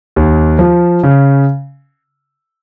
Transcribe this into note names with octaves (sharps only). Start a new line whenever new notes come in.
D#2
F3
C#3